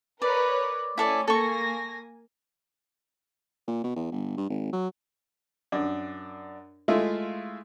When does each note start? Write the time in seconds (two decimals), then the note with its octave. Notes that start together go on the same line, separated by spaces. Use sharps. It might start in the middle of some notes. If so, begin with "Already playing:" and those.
0.22 A#4 B4 C#5 D5
0.98 A3 C#4 E4 A4 D5
1.28 A#3 A4 G#5 C#6 A#6
3.68 A#2
3.84 B2
3.96 E2
4.12 G1
4.37 G2
4.50 G#1
4.73 F#3
5.72 F#2 D4
6.88 G#3 A3 E4 F4